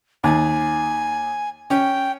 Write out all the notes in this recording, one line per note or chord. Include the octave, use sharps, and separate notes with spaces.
D#2 G#5
C#4 G5